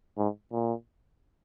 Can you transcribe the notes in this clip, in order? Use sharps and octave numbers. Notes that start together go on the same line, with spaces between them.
G#2
A#2